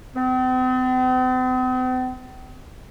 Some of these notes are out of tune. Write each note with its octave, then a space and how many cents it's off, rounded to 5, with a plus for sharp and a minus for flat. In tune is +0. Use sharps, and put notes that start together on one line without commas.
C4 -45